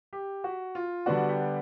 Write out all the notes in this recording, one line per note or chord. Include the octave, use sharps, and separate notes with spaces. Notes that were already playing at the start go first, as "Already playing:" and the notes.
G4
F#4
F4
D3 G3 B3 D4 F#4
G4